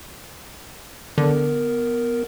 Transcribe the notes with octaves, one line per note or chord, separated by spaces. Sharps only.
D3 B3 A#4